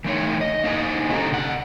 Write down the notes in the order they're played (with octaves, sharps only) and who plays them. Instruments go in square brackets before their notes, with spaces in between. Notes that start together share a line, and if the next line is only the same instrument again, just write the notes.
[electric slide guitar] E3 A3 D#4 C#5
D#5
A#3 D#4 C5 D#5 G#5
D3 C#4 G4 A4 A#5
C3 F#5